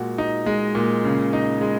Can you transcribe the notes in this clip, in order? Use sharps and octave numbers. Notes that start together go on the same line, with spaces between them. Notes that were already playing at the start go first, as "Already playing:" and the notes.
Already playing: A#2 G#3 F#4
D#4
G#3
A#2
C#3
D#4
G#3